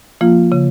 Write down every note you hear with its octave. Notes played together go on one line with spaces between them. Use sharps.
F3 A#3 F4
C#3